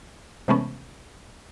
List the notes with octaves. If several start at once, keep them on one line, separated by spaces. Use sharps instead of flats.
C3 E3 G#3 A3 B3 C#4